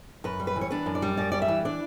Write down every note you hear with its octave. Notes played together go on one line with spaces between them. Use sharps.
F#2 B4
G3
B4
E3
C#5
D4 B4
F#2
D5
G3
F#2 D5
G3 D5
E5
E3
D4 D5